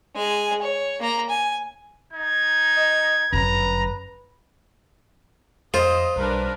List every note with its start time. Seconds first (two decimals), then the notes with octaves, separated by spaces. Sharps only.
0.15 G#3 G#5
0.62 C#5
1.00 A#3 A#5
1.29 G#5
2.13 D#4 G#6
2.77 D#5
3.33 G1 F#2 B4 A#5
5.74 F2 F4 C5 D#5
6.16 B1 G3 D4 A#4 B4 B5